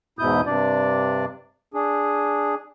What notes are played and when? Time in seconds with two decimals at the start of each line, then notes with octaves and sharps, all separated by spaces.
0.19 E2 G#2 B2 E4 D#6 G6
0.46 G2 C3 D4 D5
1.74 D4 G#4